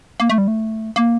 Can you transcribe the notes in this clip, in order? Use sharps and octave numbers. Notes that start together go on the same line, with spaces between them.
A#3
A3
G3
A3
A#3